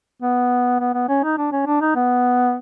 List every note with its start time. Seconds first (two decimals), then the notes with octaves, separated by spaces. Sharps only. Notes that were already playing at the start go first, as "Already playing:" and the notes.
0.22 B3
0.80 B3
0.94 B3
1.09 C#4
1.24 D#4
1.38 D4
1.52 C#4
1.66 D4
1.81 D#4
1.96 B3